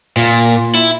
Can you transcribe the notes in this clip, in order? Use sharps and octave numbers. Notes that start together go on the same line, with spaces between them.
A#2
E4